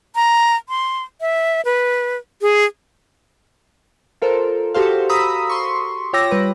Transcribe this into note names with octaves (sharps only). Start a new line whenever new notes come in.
A#5
C6
E5
B4
G#4
F4 A4 A#4 C5
F#4 G4 A4 C5 F5
A#5 B5 D#6 E6 B6
C6 C#6
F4 C#5 G5 D6 E6 A#6
G3 B4